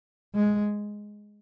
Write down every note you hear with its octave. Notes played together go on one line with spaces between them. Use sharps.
G#3